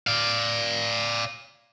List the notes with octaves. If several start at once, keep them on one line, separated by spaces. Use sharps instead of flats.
D5 F5